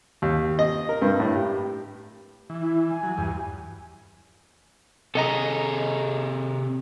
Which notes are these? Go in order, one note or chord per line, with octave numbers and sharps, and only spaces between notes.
D#2
D#5
A#4
G2
A2
G4
E3
E4
G#5
F#3
E2 G2
C3 G#4 A4 D#5 A#5